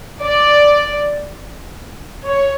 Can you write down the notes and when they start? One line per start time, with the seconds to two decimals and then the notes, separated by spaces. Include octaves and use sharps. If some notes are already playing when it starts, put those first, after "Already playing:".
0.24 D5
2.27 C#5